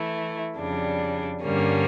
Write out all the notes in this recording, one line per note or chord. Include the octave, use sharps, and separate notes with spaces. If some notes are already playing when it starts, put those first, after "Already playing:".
Already playing: E3 A3 E4
F2 C#3 G3 D4
G2 D3 G3 A#3 C#4